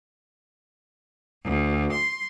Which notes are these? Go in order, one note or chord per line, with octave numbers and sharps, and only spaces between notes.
D2
C6